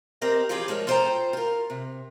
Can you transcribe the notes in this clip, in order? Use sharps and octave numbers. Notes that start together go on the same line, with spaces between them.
C4 G4 A#4 D#5
E3 F3 F4 G4 G#4
F3 G#3 A#4 C#5
F4 A4 C5 D5 G5 A#5
F4 A#4
C3